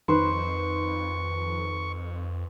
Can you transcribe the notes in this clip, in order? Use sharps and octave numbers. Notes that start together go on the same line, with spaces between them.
F2 D#3 B4 C5 C#6